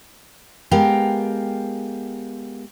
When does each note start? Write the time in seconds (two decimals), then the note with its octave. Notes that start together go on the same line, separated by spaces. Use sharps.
0.71 G#3 B3 G4 A#4 F5 G5